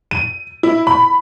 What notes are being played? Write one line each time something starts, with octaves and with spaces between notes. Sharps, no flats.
D#7
E4
B5